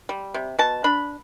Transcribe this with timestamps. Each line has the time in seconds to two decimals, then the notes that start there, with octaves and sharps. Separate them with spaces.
0.09 G3
0.34 C3
0.59 B2 A5
0.84 D4 B5